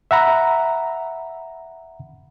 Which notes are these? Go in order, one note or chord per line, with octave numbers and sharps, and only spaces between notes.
E5 F#5 A#5 B5